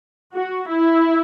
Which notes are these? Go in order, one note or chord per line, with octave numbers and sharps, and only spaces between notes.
F#4
E4